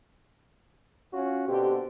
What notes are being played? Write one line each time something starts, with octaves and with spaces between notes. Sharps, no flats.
C#4 F4 F#4
B2 D3 C4 G4